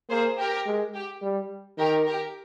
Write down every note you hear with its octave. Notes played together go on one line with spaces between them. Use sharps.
A#3 G#4 C5
G4 A#4
G#3
G4
G3
D#3 G4 A#4
G4 A#4